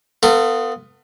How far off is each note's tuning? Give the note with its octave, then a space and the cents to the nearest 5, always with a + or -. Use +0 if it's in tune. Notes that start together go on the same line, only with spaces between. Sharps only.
B3 +10 F4 +0 A4 +40